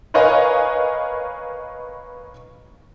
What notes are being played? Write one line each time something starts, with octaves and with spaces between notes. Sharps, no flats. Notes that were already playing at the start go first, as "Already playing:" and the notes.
A#4 B4 C#5 D#5 F5 G#5